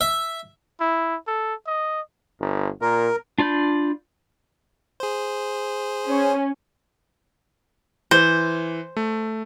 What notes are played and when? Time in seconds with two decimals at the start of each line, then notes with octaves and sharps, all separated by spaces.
0.01 E5
0.81 E4
1.27 A4
1.67 D#5
2.40 G1
2.81 A#2 A#4
3.38 D4 F4 D5 B5 G6
5.00 G#4 C5
6.08 C#4
8.11 E3 C5
8.96 A3